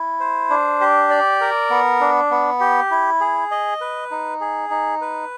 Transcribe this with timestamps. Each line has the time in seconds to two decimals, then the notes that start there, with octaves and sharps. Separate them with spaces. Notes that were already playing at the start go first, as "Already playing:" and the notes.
Already playing: E4
0.20 C5
0.50 D4
0.81 G4
1.10 D5
1.41 A#4
1.71 B3
2.01 D4
2.31 B3
2.60 G4
2.91 E4
3.21 G#4
3.51 D#5
3.81 B4
4.11 D#4
4.41 G#4
4.71 D#4
5.01 B4